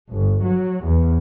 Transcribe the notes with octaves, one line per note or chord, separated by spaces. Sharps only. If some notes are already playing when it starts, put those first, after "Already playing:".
G1
F#3
E2